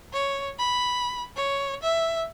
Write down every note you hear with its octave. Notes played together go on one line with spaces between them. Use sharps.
C#5
B5
C#5
E5